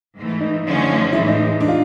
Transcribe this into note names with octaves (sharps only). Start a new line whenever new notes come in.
G#2 E3 A3
D#4
F#2 D3 F3 A3 C#4
A2 E3 G#3 E4
D#4
D4
F4